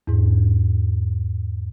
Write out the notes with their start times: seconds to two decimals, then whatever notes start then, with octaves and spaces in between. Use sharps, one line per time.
0.07 E2 G#2